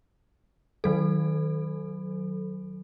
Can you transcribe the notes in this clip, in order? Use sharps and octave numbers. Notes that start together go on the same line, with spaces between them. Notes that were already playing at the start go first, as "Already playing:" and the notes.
D#3 F#3 A4